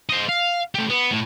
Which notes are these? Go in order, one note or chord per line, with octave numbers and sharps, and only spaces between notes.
C5 D#5
F5
A3 G4
B3
A2